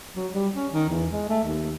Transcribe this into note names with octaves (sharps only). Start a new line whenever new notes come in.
F#3
G3
C#4
D#3
E2
G#3
A3
D#2